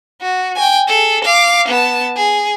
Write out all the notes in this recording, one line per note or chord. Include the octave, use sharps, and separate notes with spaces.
F#4
G5 G#5
G#4 A4
F5 D6
B3 A5
G#4